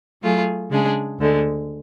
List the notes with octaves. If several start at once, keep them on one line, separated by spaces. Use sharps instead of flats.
F#3 A3 F4 G#4
C#3 G#3 D4 G#4
D2 D3 G#3